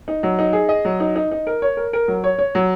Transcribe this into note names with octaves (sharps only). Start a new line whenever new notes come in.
D#4
F#3
D#4
G#4
D#5
F#3
D#4
D#4
D#4
A#4
C#5
A#4
A#4
F#3
C#5
C#5
F#3